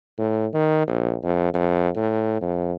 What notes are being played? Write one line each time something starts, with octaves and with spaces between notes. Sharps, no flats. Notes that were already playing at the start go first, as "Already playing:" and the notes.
A2
D#3
A#1
F2
F2
A2
F2